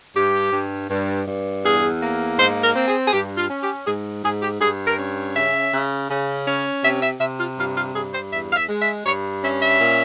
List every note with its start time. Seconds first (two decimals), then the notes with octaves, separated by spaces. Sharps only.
0.16 G2 G4
0.52 G2
0.90 G2
1.27 G2
1.64 E2 G#4
2.02 A#3
2.38 G#2 C5
2.63 A#4
2.75 C4
2.87 G#4
3.08 G#4
3.13 G2 G4
3.37 F4
3.49 C#4
3.62 G4
3.87 G#2 G#4
4.24 G#2 G#4
4.42 G4
4.61 G2 G#4
4.86 A#4
4.98 C#4
5.35 C#3 E5
5.72 C#3
6.09 C#3
6.46 C#4
6.83 C3 E5
7.02 E5
7.20 C3 E5
7.40 F4
7.57 G2 F4
7.76 F4
7.94 G2 G#4
8.13 C5
8.32 E2 E5
8.52 F5
8.56 E5
8.69 G#3
8.82 E5
9.05 G2 C#5
9.43 C#4 E5
9.62 E5
9.80 A#2